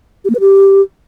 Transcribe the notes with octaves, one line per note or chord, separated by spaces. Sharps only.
G4
A#3
B4
G4